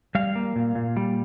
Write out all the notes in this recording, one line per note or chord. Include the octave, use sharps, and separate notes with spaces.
G3 F5
A#3
A#2
A#2
G3